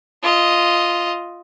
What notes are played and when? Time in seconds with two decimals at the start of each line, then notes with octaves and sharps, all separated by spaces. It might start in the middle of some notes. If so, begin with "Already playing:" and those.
0.23 F4 D#5